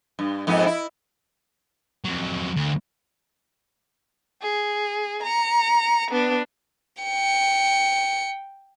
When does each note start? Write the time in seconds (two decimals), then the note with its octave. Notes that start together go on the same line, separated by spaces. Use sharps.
0.19 G2
0.47 F2 G#2 B3
0.66 E4
2.05 F2 F#3
2.56 D2
4.42 G#4
5.23 A#5 C#7
6.11 B3 D4
7.02 G5 C#7